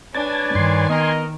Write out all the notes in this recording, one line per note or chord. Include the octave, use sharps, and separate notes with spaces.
D4 B4 C#5 D5 G#5 A5
G2 D#3 G#5 C6
B3 A#4 D#5